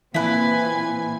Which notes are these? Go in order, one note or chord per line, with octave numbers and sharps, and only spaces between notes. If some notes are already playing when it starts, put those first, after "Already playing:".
A#2 E3 C4 E4 B4 G#5